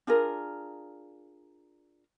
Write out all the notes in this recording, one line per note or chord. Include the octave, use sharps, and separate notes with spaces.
D4 F4 G#4 A#4